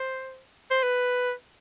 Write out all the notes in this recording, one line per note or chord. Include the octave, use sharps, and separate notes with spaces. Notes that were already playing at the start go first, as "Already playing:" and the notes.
Already playing: C5
C5
B4